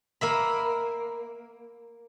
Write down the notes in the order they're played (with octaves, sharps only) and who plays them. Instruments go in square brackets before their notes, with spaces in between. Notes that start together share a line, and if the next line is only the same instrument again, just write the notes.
[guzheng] A#3 E5 B5